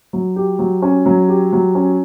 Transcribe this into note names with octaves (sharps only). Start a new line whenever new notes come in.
F#3
G4
F#3
C#4
F#3
G4
F#3
C#4